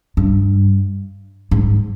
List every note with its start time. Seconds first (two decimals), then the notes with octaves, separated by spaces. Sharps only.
0.17 G2
1.51 G#2